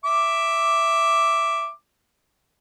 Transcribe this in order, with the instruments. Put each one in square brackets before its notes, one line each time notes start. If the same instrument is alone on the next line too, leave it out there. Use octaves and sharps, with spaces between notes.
[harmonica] E5 D6